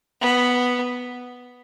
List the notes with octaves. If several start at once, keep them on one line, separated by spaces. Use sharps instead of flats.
B3